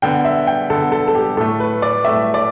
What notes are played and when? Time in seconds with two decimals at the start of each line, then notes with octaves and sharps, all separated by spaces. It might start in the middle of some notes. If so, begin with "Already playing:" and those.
0.02 D3 B3 G5
0.25 E5
0.47 G5
0.70 D3 B3 A4
0.92 A4
1.08 A4
1.15 G4
1.37 A2 A3 A4
1.60 B4
1.82 D5
2.04 A2 A3 E5
2.34 D5